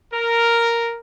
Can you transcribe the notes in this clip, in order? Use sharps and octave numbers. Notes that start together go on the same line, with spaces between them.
A#4